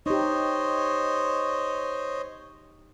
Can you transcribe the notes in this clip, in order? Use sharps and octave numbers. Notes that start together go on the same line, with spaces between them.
D#4 G4 C5 C#5 D#5